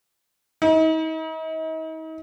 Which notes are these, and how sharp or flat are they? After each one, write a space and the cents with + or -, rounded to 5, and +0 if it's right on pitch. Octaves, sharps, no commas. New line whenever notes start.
D#4 +40